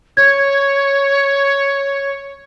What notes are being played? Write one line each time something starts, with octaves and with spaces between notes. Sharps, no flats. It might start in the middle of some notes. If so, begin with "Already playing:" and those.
C#5 G#6